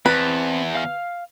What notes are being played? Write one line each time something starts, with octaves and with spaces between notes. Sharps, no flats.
E2 C4 B4 A5
F5 F6